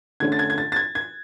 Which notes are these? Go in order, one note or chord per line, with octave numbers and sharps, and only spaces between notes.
D3 A3 C#4 G#6
A6
G#6
G#6
A6
A6
G#6
G#6